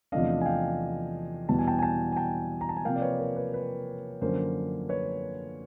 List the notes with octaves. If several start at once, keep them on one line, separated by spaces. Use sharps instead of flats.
E2 C3 F3 A3 D4 D#5 F5
G#5
F5 G5
E2 B2 G3 B3 E4 A5
G#5
G5 A5
G#5
G5 A5
G#5
G5 A5
A#5
A5
G#5
C3 F3 A#3 F5 G5
D5
B4 C#5
A#4
B4
B4
F#2 D3 F3 A#3 C#4 A#4 C5
B4 C#5